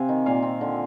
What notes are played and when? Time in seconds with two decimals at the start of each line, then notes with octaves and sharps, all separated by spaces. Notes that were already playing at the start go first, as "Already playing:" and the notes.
Already playing: C3 C4 F5 G#5
0.09 D#3
0.26 A#2 F5 G#5
0.43 C4
0.61 D3